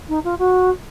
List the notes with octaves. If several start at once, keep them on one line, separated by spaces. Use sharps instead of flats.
D#4
F4
F#4